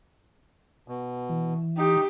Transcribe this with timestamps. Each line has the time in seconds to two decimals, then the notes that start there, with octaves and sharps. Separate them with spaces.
0.88 B2
1.29 E3
1.77 D#4 G4